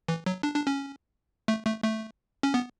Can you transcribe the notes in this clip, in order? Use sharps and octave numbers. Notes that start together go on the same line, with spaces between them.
E3
F#3
D4
D4
C#4
A3
A3
A3
C#4
B3